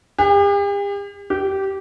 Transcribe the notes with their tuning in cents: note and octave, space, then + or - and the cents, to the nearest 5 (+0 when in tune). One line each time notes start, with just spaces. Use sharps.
G4 +45
G4 -15